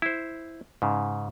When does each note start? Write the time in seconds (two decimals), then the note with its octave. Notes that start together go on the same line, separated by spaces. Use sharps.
0.02 E4 C5
0.82 G#2 C#3